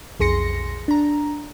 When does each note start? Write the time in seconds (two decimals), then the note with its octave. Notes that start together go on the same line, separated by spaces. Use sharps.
0.20 B1 F2 G#4 C6 A#6 C#7
0.88 D4 A#5